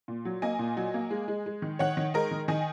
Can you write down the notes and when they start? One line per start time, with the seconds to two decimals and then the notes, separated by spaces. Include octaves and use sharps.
0.08 A#2
0.25 F#3
0.42 A#3 D#5 G#5
0.59 A#2
0.77 F#3
0.94 A#3
1.11 G#3
1.28 G#3
1.46 G#3
1.62 D#3
1.79 D#3 C#5 F#5
1.97 D#3
2.14 G#3 A#4 D#5
2.31 D#3
2.48 D#3 D#5 G#5